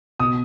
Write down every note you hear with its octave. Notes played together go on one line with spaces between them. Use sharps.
B2 D#6